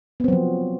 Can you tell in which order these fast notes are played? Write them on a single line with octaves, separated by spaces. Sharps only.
B3 C4 F#3 F3